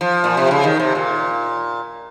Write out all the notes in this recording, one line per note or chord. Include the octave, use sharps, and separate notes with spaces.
F3
A#2
C3
C#3
D#3
C3
A#2